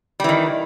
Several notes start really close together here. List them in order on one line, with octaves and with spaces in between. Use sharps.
G3 E3 D#3